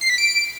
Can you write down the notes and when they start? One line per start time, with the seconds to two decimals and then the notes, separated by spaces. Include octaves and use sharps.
0.01 C7
0.10 B6
0.18 D7